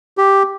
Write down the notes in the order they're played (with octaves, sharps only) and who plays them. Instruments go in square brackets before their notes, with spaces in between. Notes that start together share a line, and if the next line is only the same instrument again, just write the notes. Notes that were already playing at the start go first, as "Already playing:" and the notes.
[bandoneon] G4